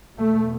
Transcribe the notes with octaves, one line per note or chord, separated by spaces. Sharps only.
E2 B2 A3